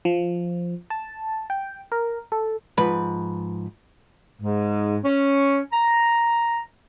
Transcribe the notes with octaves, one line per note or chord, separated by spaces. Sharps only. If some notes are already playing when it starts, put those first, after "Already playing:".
F3
A5
G5
A#4
A4
G#2 F3 B4 B5
G#2
C#4
A#5